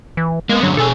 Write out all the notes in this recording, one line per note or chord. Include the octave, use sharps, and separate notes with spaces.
E3
G#3 A#3 B3
G2 D3 F#3 C#4
B2 G#4 A4 G#5